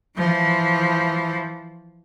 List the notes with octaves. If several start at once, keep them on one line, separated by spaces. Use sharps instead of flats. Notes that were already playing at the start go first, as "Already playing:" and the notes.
E3 F3